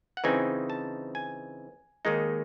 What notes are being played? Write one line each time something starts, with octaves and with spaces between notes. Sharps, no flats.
F#5
C#3 E3 C4 D#4 G#5
A5
G#5
D#2 D#3 G#3 D#4